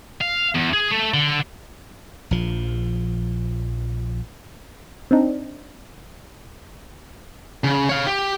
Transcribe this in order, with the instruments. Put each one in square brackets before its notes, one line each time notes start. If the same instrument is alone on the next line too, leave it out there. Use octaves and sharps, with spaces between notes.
[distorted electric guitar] F5
E2
G#4
A3
D3
[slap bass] A#1 F3
[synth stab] C4 D4 D#4
[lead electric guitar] C#3
C#5 F5
G4